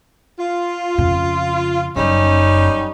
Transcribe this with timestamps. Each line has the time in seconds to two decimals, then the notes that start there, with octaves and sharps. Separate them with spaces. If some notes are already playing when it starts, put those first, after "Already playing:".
0.38 F4
0.98 F2 C#3
1.96 F#1 F#2 G3 C#4 D#4